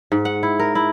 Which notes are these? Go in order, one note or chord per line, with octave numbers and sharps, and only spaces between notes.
G#2
F#5
E4
A#4
E4